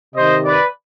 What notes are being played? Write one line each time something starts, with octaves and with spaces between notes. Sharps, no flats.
C3 D#3 C5 D#5
B4 D5